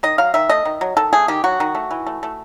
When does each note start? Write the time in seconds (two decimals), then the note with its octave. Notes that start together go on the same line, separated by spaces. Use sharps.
0.03 D#3 D#5
0.18 F#3 F5
0.34 D#3 E5
0.49 A3 D#5
0.65 D#3
0.81 F#3
0.97 D#3 A4
1.13 A3 G#4
1.28 D#3 G4
1.44 F#3 F#4
1.60 D#3
1.75 A3
1.91 E3
2.07 A3
2.23 A3